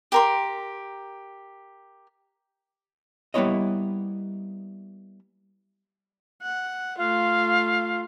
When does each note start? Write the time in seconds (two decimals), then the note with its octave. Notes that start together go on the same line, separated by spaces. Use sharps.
0.12 G4 A#4 C6
3.34 G3 A#3 B3 E4 C#5 D#5
6.42 F#5
6.98 A3 F4 F5